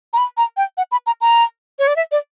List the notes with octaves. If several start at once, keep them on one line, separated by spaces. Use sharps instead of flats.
A#5
B5
A#5
G5
F#5
B5
A#5
A#5
C#5
D5
E5
D5